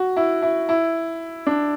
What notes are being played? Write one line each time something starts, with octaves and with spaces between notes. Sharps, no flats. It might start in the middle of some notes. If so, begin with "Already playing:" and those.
Already playing: F#4
E4
E4
E4
D4